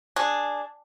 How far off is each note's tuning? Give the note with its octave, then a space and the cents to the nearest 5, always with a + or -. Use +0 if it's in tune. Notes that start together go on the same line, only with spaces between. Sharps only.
D4 +0 G#4 -5